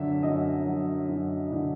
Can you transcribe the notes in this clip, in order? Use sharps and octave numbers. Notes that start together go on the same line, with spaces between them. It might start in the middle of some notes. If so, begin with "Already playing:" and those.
Already playing: F#2 D3 E5
F#2 D#5
F#3
F#2
D3